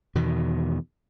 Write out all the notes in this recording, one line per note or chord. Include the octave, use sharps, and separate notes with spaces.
E2 B2 D#3